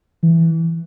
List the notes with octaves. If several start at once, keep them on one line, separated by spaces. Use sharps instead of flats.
E3